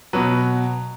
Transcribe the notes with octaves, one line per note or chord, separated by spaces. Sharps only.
B2 F#3 B4